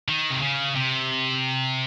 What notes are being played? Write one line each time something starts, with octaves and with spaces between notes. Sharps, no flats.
D#3
C3
C#3
C3